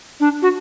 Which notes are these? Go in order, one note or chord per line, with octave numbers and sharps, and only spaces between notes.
D4
F#4